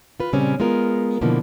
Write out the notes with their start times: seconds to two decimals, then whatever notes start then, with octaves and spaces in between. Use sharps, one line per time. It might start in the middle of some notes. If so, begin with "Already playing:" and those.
0.20 F4 B4
0.33 A#2 C#3 G3 C4 C#4
0.60 G#3 B3 F4 A#4
1.21 B2 D3 E3 F3 A#3